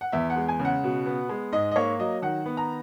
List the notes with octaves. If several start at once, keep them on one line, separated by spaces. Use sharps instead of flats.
F#5
E2 E5
F#5
G#3
G#5
C#3
F#5
B2
B3
G#3
G#2 D#5
D#5
A#3 C#5
F#3 D#5
D#3 F#5
B3
A#5